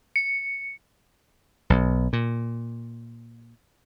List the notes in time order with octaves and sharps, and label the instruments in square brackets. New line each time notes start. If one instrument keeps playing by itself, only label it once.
[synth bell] C#7
[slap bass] B1
A#2